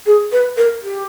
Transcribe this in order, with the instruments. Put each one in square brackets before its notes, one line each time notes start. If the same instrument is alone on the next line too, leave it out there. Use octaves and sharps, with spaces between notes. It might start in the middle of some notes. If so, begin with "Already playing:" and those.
[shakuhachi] G#4
B4
A#4
G4